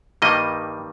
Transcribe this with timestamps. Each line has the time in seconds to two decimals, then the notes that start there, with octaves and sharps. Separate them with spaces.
0.22 G2 D#3 G3 A#3 D#5